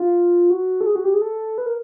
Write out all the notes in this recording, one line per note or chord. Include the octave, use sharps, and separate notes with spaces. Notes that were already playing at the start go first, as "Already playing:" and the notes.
Already playing: F4
F#4
A4
G#4
F#4
G4
G#4
A4
B4
A#4